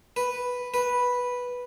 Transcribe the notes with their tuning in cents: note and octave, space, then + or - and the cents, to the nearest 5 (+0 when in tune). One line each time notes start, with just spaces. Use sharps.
B4 +0
B4 -5